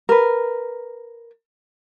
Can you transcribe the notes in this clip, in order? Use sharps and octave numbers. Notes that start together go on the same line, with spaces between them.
A#4 B4